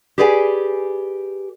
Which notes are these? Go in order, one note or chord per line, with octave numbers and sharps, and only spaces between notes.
G4 G#4 B4 D5 G5 G#5